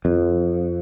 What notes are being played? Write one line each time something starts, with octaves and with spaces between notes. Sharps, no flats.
F2